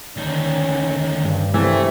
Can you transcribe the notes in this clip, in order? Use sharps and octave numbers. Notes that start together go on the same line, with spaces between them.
D2 D#3 C#4
G2
G2 C3 E3 A3